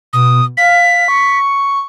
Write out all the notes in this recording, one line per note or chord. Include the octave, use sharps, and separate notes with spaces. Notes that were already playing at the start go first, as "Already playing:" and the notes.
B2 D#6
F5 B6
C#6